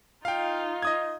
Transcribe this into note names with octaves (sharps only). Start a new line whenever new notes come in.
D#4 F4 F5 G5
D#5 D#6 G#6